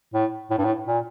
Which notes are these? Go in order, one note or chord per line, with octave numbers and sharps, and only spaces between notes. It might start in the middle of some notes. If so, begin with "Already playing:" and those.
A2
A2
G2
A2
A#2